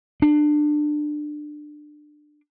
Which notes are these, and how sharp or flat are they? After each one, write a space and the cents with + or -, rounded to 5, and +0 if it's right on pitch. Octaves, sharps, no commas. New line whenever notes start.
D4 +25